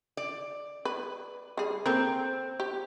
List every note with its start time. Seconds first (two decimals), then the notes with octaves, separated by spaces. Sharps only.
0.17 D5
0.85 B4
1.57 G3 G#4
1.86 A#3 C4 A4 A#4
2.60 G4